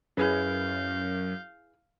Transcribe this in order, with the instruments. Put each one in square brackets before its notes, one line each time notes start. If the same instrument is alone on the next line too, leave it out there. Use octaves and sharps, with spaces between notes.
[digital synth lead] F#2 [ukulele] E4 G#4 B4 [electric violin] F5 G6